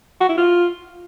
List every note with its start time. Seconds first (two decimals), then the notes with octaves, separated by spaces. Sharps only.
0.21 F#4
0.29 E4
0.38 F4